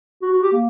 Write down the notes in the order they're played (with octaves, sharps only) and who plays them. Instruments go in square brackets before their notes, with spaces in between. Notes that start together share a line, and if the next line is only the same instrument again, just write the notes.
[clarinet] F#4
F#4
G4
A#3